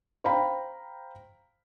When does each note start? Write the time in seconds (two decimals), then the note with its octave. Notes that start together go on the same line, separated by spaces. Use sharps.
0.24 C5 F5 G5 A#5 B5